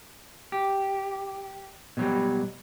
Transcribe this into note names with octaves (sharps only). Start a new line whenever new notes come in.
G4
B2 F#3 G3